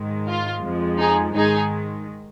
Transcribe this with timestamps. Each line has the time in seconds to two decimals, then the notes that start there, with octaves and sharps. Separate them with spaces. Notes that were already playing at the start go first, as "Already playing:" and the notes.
Already playing: G#2 D#3 G#3
0.28 F4
0.64 F2 F3 G#3
1.00 D#4 G#4
1.36 G#2 D#3 G#3 D#4 G#4